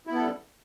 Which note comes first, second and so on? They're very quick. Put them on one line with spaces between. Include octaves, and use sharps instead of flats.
E4 B3 A4 G3